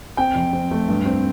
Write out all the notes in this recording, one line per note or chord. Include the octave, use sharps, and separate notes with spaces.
C4 G5
F2
C4
A3
G2
C4